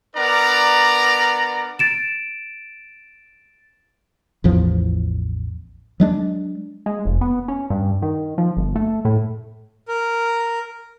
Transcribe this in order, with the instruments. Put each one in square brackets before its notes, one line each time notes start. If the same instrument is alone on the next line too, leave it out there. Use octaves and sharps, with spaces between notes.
[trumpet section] B3 D4 A#4 D5 A#5
[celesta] A6 D7 E7
[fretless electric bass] A1 E2 F3
F#3 G#3 D4
[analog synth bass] G#3
F1
B3
C#4
G2
D#3
F3
G1
A3
A2
[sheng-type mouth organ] A#4